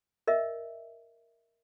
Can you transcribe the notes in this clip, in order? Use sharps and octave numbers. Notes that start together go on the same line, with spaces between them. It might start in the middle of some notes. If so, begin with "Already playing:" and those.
A#4 D#5 E5